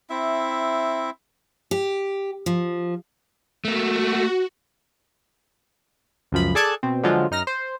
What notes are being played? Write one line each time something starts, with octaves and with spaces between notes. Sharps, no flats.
C4 E4 E5
G4
F3
A3 A#3 F#4
C#2 F#2 F3 B5
G#4 A4 D5 A5 F#6 G#6
B2 C4
D3 F3 F#3 G#3 F4
F#2 D#4 F6 A#6
C5